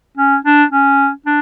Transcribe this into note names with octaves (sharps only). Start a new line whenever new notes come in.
C#4
D4
C#4
D4